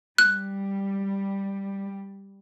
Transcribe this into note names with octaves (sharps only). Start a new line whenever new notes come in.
G3 F#6